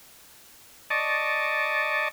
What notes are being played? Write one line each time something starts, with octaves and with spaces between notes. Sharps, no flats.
D5 D#5 A5 C#6